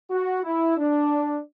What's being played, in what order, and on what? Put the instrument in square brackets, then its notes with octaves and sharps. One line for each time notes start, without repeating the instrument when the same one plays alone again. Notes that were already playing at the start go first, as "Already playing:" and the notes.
[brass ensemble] F#4
E4
D4